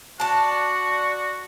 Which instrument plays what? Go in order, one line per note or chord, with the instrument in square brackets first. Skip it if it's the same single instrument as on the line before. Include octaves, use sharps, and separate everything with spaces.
[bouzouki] D4 A5 [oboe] F#4